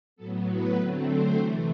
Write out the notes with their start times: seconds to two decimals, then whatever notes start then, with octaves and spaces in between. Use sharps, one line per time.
0.16 A2 F#3 B3 A4
0.46 B4
0.76 D3 F#3 A3 C4
1.06 C5
1.36 C3 E3 A3